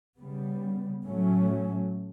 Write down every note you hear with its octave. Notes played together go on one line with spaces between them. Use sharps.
C#3 G3 B3
A2 F#3 A3 C#4